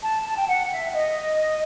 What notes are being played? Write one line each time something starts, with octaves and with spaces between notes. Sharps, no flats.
A5
A5
G5
F#5
E5
D#5